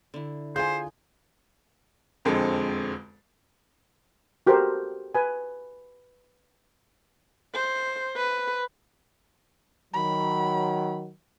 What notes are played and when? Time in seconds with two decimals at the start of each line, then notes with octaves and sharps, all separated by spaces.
0.14 D3 E4
0.56 F4 G#4 C5 G#5 G6
2.25 E1 F2 D3 G#3 C4 A4
4.47 F#4 G4 A4 A#4 C5
5.15 B4 G#5
7.55 C5
8.16 B4
9.94 D#3 F#3 B5